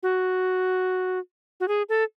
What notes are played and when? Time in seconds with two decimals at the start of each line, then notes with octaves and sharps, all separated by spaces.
0.03 F#4
1.60 F#4
1.68 G#4
1.89 A4